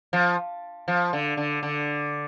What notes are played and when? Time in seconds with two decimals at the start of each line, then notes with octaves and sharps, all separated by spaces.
0.13 F3
0.88 F3
1.13 D3
1.37 D3
1.63 D3